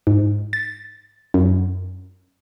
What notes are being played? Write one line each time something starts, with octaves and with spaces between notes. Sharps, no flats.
G#2
A6
F#2